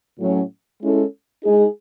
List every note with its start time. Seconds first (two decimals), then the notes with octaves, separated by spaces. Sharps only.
0.18 A2 F#3 C#4
0.81 G#3 C#4 E4 A4
1.44 G#3 D#4 G#4